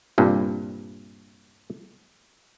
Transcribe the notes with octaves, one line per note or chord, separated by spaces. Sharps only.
C2 G2 A#2